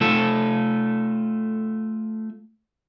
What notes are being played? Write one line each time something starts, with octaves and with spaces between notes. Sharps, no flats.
A3 F4 A4